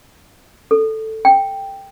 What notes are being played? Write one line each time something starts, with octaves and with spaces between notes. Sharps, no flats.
A4
G5